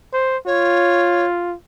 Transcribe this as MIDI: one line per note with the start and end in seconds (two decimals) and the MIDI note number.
0.13 0.37 72
0.47 1.55 65
0.47 1.26 73